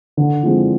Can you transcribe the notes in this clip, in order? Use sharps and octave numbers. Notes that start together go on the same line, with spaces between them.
D3
F3 G#3 C4 E4